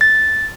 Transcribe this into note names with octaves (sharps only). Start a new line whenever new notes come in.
A6